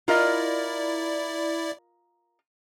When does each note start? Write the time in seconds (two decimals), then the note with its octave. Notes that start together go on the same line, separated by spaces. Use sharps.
0.08 E4 F4 A#4 D5 D#5